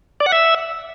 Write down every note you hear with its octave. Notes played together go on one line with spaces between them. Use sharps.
D5
F#5
E5